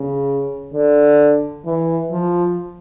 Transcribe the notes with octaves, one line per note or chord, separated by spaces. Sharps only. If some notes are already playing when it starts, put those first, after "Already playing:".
Already playing: C#3
D3
E3
F3